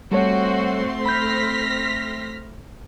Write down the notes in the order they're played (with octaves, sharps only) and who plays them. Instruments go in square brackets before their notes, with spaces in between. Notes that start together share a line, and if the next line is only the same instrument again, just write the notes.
[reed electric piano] G3 A4 C#5 [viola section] A3 C4 C6 [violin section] F#4
[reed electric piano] B5 G6 [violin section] F6 A#6 B6